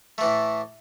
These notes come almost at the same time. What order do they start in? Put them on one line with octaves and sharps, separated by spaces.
A3 E3 A2